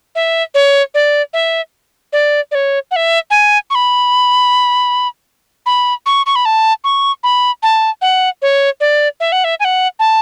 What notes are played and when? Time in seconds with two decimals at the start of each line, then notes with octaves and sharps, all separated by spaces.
0.15 E5
0.54 C#5
0.94 D5
1.33 E5
2.13 D5
2.51 D5
2.55 C#5
2.91 F#5
2.96 E5
3.30 G#5
3.70 C#6
3.75 B5
5.66 B5
6.06 C#6
6.26 C#6
6.36 B5
6.45 A5
6.84 C#6
7.23 B5
7.63 A5
8.02 F#5
8.42 C#5
8.80 D5
9.20 E5
9.32 F#5
9.44 E5
9.60 G#5
9.65 F#5
9.99 A5